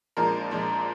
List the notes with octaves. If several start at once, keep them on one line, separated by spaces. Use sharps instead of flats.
A#1 A#2 F3 G#3 A#4
A#1 A#2 F3 G#3